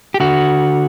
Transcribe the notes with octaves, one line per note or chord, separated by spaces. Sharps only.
G4
D3 F#4